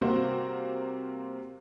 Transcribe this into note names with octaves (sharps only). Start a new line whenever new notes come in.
C3 G3 A#3 C4 F#4 C5